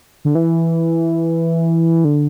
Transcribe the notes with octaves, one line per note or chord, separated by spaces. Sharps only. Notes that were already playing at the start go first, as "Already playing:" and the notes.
D3
E3
D3